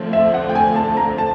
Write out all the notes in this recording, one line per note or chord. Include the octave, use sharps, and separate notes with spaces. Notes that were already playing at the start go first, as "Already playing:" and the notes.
Already playing: D3 F3 A3 C4
E5
F#5
G5
G#5
A5
A#5
A5